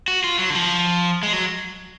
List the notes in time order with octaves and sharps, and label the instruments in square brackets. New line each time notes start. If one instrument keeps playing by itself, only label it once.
[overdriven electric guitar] F#4
F4
F#3
D3
F3
G#3
F#3